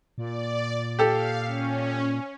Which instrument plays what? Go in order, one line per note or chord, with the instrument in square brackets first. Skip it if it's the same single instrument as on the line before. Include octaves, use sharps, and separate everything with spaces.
[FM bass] A#2 [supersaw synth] D5
[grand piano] G4 A4 [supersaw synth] F5
[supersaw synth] C#4